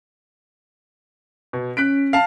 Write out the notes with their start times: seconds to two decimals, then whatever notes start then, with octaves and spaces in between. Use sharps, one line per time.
1.53 B2
1.77 C#4 F#6 B6 D7
2.13 F5 A5